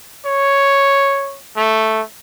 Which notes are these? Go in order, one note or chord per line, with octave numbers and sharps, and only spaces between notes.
C#5
A3